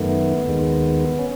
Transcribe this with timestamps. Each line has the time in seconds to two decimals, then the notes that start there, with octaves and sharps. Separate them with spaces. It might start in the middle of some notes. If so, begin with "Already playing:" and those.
Already playing: F#2 D#3 A3 B3
0.48 D#2 D#3 G#3
1.19 C#4